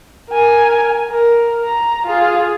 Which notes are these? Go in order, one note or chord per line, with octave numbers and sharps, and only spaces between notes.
A#4 G#5
A#4
A#5
F4 G#4